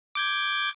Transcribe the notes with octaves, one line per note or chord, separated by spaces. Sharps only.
D6 G6 G#6